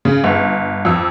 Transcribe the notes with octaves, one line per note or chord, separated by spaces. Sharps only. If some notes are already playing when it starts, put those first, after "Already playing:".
C#3
G1
F2 E6